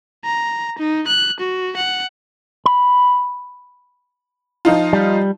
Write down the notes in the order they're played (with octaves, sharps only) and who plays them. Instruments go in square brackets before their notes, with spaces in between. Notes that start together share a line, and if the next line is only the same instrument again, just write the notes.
[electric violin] A#5
D#4
F#6
F#4
F#5
[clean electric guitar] B5
[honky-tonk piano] F3 D#4 F4
[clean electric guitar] G3